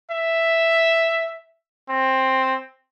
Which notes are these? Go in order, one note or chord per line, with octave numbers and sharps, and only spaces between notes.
E5
C4